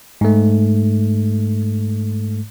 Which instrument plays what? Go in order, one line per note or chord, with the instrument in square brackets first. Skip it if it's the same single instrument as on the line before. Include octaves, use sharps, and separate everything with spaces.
[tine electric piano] G#2 A3